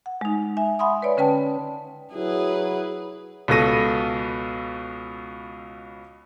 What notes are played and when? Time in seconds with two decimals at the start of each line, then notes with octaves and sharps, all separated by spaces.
0.06 F#5
0.21 G#3 D#4
0.57 E5 G#5
0.79 E5 F#5 G#5 B5 C6 D#6
1.02 B4 C#5 D5
1.17 D3 C#4 B4 G5 A5
2.14 F#3 E4 G#4 B4
3.48 C#2 B2 A4 A#6 D#7